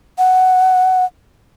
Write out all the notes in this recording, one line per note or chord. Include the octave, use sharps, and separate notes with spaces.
F#5